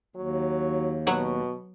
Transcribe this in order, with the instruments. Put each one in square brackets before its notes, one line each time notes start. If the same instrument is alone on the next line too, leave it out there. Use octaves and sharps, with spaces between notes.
[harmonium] D#2 [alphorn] F#3
[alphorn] B2 [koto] F#3 C#5 F#5